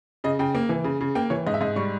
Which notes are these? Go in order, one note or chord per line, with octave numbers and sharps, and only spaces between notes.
C#3 D#5
C#3 G5
A#3
E3
C#3
C#3
A#3 G5
E3 C#5
G#2 D#5
E5
G#2 D#5
G3 C#6